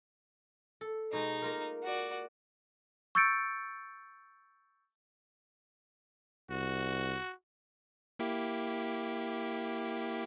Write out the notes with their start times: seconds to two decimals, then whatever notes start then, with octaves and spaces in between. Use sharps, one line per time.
0.81 A4
1.13 B2 G#3 D#4
1.42 A#3 F4 A#4
1.83 F#4 D5
3.15 C#6 E6 G6 A6 C#7 D7
6.51 C2 F#4
8.19 A#3 E4 G4